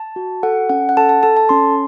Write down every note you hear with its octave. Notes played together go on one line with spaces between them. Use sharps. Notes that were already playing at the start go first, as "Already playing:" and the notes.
Already playing: A5
F#4
A4 F#5
C#4 F#5
F#5
A4 A5
A5
A4 A5
A5
C#4 C6